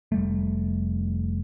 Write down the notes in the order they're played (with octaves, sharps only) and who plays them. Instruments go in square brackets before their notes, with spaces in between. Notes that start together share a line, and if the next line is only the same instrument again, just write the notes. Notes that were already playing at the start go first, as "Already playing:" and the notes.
[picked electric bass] F1 G3 A3